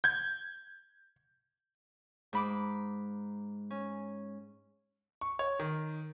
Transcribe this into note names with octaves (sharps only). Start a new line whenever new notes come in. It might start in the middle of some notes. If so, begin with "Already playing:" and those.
G6 G#6
G#2 B5 D6
C#4
C#6
C#5
D#3